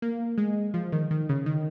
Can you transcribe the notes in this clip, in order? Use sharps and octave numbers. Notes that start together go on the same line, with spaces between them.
A#3
G#3
F3
D#3
D#3
C#3
D#3